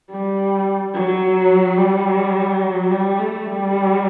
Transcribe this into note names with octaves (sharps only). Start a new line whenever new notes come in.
G3
F#3
G3
F#3
G3
A3
G3